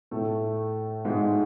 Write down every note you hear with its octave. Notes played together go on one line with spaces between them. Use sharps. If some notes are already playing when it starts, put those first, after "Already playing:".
A2 A3
G#2 G#3